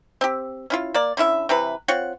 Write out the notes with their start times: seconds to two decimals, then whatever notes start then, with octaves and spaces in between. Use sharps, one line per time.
0.21 C4 G4
0.70 C#4 E4 F4
0.94 A#3 D5
1.17 D3 C#4 E4 E5
1.49 C3 E3 B4
1.88 C4 F4 C#5 F#5